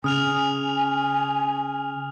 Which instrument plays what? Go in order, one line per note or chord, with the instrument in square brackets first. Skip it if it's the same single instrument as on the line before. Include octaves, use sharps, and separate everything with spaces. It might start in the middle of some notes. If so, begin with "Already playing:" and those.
[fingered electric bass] C#3 [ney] G#5 [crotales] D#6 F6 F7